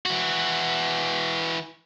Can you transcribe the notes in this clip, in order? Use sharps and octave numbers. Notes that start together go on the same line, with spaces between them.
E3 F#4